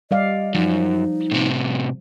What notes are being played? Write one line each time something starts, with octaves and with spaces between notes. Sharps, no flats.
G3 D5 D#5 F5
F#2 F3 D#4
A2 C3